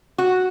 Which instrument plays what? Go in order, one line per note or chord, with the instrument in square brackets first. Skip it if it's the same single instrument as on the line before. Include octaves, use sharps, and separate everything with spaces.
[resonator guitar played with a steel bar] F#4